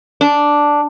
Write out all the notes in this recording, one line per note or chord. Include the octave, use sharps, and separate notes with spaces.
D4